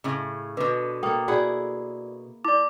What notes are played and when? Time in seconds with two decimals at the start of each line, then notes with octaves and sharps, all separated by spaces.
0.04 A2 C#3
0.57 B2 D3 B4
1.03 A#3 A4 G5 D#6
1.28 E4 F#4 G#4 D5 F#5
2.45 E4 D5 D6